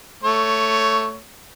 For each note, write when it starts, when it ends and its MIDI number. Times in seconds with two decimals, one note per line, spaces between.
0.23 1.18 57
0.23 1.18 73